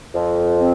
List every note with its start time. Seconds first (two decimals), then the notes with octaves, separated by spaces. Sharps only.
0.15 F2
0.56 C4